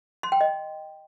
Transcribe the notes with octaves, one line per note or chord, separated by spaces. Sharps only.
C6
G5
D#5